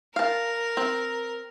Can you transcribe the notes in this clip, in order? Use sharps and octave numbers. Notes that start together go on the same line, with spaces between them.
A#4 F5 A5
C4